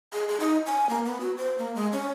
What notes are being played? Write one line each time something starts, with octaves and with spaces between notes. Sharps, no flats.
G#4
G#4
D#4
G#5
A#3
B3
F#4
C5
A#3
G#3
C#4